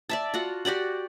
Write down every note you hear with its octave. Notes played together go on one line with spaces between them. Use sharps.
D5 E5 A5
F4 F#4 F#5
F#4 G4 D5 F#5